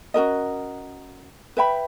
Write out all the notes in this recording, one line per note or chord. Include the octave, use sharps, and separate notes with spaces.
C#4 F#4 A#4 D#5
B4 E5 G5 B5